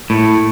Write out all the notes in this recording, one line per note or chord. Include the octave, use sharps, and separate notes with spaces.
A2